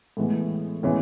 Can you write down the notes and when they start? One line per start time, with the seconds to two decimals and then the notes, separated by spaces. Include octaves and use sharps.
0.17 A2 E3 G#3 B3
0.83 A2 E3 G#3 B3 C#4